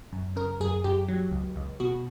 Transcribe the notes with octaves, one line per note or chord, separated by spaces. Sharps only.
F#2
C#3 A#4
F#2 G#4
F#2 G4
F#3
C#2
C#2
B2 F#4